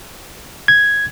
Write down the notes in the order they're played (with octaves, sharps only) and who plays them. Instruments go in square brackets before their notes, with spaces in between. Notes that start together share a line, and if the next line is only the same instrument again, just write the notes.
[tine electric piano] G#6